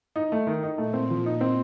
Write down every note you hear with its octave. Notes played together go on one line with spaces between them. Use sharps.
D#4
A3
D#3
D#4
A#2 A3
C4
F3
D#4
C4